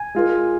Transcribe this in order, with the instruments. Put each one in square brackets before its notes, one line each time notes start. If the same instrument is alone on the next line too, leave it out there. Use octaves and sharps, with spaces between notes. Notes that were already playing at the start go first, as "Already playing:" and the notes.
Already playing: [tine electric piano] G#5
[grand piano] G#3 F4 A#4